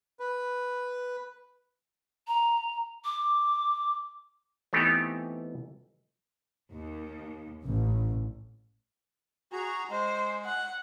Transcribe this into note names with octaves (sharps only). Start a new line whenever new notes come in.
B4
A#5
D6
E3 A3 B3 C4 D#4 G4
D#2
A1
F#4 G#4 A#5
G#3 C5
F#5